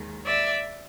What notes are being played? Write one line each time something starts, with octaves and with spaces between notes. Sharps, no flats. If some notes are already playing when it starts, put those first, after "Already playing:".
Already playing: D#2 D#3 G#3
D5 E5